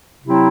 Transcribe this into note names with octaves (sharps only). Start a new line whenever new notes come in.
C3 F#3 C4 E4